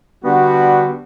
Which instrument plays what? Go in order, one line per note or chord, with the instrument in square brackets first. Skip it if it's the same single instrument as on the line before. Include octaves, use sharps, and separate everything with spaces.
[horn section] D3 G3 B3 D4 F#4